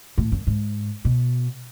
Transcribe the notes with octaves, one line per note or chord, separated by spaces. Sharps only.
A2
F#2
G#2
B2